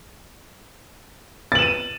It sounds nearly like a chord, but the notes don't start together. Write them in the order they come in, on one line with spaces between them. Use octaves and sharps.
A6 F#7 E7 D#7